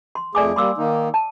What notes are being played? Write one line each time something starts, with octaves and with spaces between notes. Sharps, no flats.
C6
F2 A3 G#4 D5 G#5 D6
G3 A#3 C6 D6 E6
D#3 A#3 D#4
A5